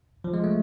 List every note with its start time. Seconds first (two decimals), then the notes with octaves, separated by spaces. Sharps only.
0.24 F3
0.34 G#3
0.44 A3